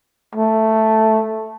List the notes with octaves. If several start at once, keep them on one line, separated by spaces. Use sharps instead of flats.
A3